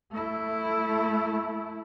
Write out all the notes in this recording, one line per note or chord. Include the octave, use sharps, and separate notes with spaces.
A3 E4